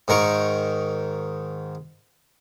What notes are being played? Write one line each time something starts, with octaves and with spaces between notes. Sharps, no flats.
G#2 D#3 A#4 C#6